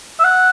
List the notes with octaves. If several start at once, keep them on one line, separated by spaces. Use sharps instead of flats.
E5
F#5